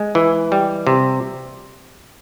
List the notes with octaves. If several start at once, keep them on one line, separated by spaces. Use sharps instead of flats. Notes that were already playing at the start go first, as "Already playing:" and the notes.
Already playing: G#3
E3
G3
C3